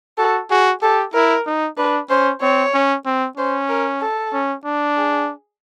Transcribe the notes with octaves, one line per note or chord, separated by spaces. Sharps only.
F#4 A4
F#4 G#4
G4 A4
E4 A#4
D#4
D4 B4
C#4 C5
C4 C#5
C#4
C4
C#4 C5
A#4
A4
C#4
D4
G#4